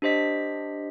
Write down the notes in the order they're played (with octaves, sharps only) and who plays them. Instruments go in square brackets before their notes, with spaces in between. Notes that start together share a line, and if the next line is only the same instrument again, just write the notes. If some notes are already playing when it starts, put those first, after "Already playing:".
[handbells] D4 G4 C5 D#5 B6